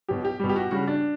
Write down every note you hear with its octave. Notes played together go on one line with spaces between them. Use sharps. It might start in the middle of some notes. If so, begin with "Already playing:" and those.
B2 F#3 G4
G4
B2 G3
G4
F#4
C#3 G3 F#4
D4